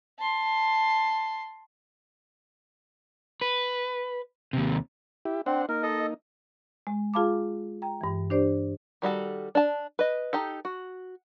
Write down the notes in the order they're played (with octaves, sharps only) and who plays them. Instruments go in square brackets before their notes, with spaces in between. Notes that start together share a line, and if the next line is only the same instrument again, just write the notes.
[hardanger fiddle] A5 C6
[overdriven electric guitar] B4
D#2 C3
[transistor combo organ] E4 G4
[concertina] C4 [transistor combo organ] D4 C5 F#5
[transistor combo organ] A#3 D#4 [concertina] A#4
[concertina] A4 D#5
[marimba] G#3
F4 G#4 F5 A5 B5 D6
G5 A#5
G2 E3
D4 G4 C5 D5
[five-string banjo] D#3 G3 F#4 A4
D4 A5
B4 D#5
D#4 G4 A4
F#4